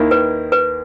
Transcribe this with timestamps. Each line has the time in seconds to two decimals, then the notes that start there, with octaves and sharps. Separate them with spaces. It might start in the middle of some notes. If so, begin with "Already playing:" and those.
Already playing: D#2 D#3 A#3 E4
0.11 B4
0.52 B4